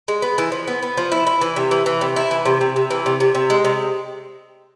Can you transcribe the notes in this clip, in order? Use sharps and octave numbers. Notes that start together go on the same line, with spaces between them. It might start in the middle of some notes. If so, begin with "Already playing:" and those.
G#3
B3
E3
F3
B3
B3
F3
E4
E4
E3
C3
E3
E3
C3
E4
E3
C3
C3
C3
E3
C3
C3
C3
G#3
C3